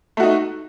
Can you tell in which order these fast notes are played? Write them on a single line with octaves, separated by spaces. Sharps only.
A3 F#4 D#4